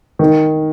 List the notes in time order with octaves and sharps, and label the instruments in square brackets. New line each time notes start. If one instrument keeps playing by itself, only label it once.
[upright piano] D#3